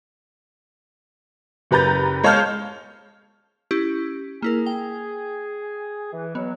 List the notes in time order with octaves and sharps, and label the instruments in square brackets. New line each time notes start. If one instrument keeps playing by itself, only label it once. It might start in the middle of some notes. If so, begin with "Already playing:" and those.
[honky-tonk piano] F#1 G4 B4 A#5 G6 A6
G#3 C#5 F5 A5 F6 G6
[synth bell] C#4 E4 G4
[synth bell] A#3 E4 A#4 [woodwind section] G#4
[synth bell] G5
[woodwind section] E3
[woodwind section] B2 F#3 [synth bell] B3